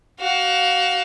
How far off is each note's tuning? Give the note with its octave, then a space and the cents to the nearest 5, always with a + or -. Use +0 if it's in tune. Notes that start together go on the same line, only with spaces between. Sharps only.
F#4 +30 F5 +25